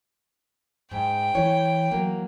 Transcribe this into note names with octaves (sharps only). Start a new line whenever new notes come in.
G#2 G5
E3 C#5
F#3 A#3